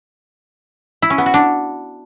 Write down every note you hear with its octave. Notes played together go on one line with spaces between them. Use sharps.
E4
C#4
B3
F#4
D4